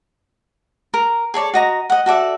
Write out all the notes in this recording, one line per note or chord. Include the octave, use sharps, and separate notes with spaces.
A#4
G#4 A4 C#5 D5
F#4 D#5 A#5
D#5 F#5
F#4 A4 D5 E5